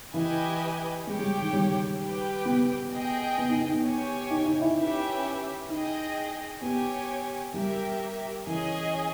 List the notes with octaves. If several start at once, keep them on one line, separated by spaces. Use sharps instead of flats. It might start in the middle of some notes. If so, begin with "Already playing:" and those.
E3 E4 G4 B4 D#5 G#5
G#3 G4 C#5 G5
G3
D#3
G3
G4 B4 G5
B3
G#4 D#5 G5
B3
D#4
D#4
B3
G4 C#5 G#5
D#4
D#4
E4
C#4 G4 B4 E5
D#4 G#4 D#5 G5
B3 G4 C#5 G#5
G3 G4 A#4 E5
E3 C#4 G#4 D#5 G#5